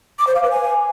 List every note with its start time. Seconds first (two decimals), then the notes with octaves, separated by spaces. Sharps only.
0.19 D6
0.27 C5
0.35 F5
0.43 B4
0.51 G#5